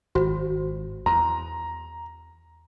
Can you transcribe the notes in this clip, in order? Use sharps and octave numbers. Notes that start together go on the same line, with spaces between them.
G#1 F4 F#4 C5
E2 A#5 C6